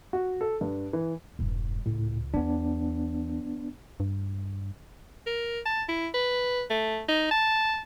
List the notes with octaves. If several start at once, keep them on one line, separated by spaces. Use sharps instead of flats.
F#4
A4
G2
E3
E1 G2
C#2 A2
E2 B3 D4
G2
A#4
A5
E4
B4
A3
D#4
A5